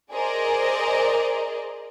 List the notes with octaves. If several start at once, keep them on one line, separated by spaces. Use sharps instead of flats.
G#4 A#4 C5 D5 D#5